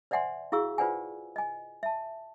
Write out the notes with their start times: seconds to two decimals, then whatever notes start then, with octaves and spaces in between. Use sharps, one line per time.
0.11 C5 D5 E5 F#5 G#5 C6
0.52 E4 F#4 G#4 F5 C#6 E6
0.78 F4 B4 C5 D5 F#5 G#5
1.36 D#5 G#5
1.83 E5 A5